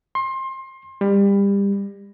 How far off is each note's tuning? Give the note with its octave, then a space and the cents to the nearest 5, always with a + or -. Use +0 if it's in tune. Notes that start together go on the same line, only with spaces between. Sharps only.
C6 +25
G3 +25